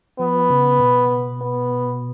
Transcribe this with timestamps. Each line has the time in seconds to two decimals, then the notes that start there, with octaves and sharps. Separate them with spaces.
0.19 F3 B3
0.50 C#3
0.80 B2
1.41 B3